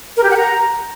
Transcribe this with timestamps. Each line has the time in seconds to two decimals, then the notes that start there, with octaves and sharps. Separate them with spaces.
0.17 A#4
0.24 G4
0.30 F#5
0.37 A#5